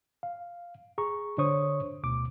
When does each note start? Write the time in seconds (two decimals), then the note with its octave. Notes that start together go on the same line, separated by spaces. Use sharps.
0.23 F5
0.98 G#4 A#5 C#6
1.38 D3 D4 C5 C#5 C#6 D#6
2.03 D2 B2 D6